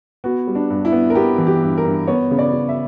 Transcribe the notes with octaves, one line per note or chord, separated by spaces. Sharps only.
B3 F#4
G3
D4
G2
E4
B3
A#4
B3 G4
E3
G4
G2
A#4
G2
B3 C#5
C#3
D5
C#3
E5